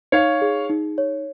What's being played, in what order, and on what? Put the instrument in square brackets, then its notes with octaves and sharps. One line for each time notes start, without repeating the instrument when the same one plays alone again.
[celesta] D#4 [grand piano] C#5 F5
[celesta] G#4
D#4
C#5